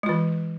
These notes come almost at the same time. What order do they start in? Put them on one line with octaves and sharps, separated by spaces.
G#3 F4 E3